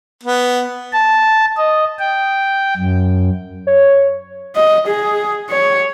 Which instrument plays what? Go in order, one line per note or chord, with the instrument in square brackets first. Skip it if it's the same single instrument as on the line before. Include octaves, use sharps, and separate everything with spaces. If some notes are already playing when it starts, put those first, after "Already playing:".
[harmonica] B3
[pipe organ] A5
D#5
G5
F#2
[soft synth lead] C#5
[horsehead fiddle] D#5
G#4
C#5